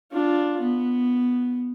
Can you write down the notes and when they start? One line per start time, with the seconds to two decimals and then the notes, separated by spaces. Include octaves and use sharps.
0.12 D4 F4
0.61 B3